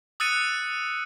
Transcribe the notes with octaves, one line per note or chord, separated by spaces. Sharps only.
D#6 E6 F#6 A6 C#7 D#7